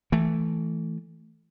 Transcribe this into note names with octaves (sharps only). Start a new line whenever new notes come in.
E3 A3